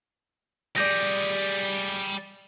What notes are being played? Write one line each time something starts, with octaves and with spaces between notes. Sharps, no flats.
G3 G#4 D5 G6 A#6